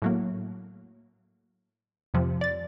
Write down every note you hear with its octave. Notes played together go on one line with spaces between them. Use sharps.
A2 F#3 A#3
F2 C3 F3
D5 A6